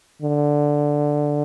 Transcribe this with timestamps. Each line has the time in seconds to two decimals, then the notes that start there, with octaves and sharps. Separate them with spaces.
0.22 D3